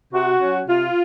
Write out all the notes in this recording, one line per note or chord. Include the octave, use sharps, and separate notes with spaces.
C3 F#4
F#3 C#4
C3 F4